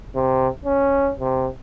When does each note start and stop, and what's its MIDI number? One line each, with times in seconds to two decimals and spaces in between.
0.15 0.48 48
0.65 1.11 61
1.19 1.47 48